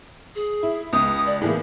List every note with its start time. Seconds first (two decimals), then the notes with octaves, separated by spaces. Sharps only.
0.35 G#4
0.63 E4
0.93 C#2 D#6
1.26 D5
1.41 A2 E3 A#3 G#4